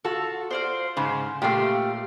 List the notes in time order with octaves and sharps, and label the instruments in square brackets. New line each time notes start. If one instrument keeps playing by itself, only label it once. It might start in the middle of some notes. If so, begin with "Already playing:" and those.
[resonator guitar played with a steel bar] F4 A4 [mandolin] F#4
[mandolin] C5 D5 F5
[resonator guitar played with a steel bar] G#2 C#3 [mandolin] C5
[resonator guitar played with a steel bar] A#2 A3 [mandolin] G4 F5